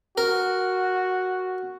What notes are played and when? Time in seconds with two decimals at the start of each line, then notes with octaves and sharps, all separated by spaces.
0.18 F#4 A#4